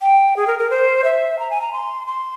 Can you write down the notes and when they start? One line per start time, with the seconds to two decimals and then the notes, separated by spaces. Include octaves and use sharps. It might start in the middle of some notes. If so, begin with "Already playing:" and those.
0.02 G5
0.36 G#4
0.47 A#4
0.59 A#4
0.70 C5
1.04 E5
1.39 A#5
1.50 G#5
1.61 A#5
1.73 C6
2.07 C6